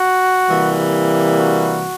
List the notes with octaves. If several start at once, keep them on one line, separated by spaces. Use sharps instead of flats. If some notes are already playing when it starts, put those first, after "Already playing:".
Already playing: F#4
C3 E3 G3 A#3
F#4